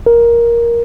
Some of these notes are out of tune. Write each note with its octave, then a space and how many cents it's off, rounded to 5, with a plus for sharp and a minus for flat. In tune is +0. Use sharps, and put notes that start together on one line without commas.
A#4 +10